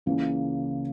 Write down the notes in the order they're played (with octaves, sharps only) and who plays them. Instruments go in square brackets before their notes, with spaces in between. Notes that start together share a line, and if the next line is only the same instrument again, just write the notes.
[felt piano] C#2 C#3 E3 A#3